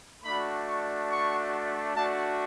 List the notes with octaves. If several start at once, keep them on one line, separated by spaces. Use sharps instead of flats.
A3 D4 F#4 B5
C#6
C#6
A3 D4 F#4 A5